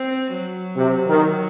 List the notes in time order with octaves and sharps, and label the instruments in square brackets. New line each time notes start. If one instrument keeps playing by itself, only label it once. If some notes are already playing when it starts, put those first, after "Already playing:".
Already playing: [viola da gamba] C4
F#3
[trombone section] C3
D#3